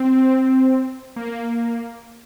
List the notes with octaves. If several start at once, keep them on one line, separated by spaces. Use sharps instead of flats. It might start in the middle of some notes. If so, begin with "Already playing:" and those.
Already playing: C4
A#3